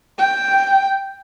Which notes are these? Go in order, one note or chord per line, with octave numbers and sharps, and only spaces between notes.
G5